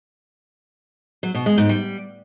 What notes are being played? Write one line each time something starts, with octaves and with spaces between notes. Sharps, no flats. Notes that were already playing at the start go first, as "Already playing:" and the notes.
F#3
B2
G#3
G#2
G3